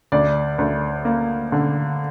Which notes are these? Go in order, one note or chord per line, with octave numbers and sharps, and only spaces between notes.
D2 D5
D2
A#3
D3